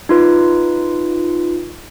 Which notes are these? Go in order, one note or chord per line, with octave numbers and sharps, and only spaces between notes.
D#4 F4 B4